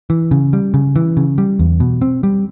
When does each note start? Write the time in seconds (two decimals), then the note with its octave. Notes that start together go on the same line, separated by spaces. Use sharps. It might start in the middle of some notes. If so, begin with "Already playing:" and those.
0.10 E3
0.31 C#3
0.53 G3
0.74 C#3
0.96 E3
1.17 C#3
1.38 G3
1.59 E2
1.80 B2
2.02 C4
2.23 G3